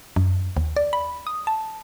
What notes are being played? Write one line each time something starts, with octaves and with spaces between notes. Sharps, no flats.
F#2
D#2
D5
B5
D#6
A5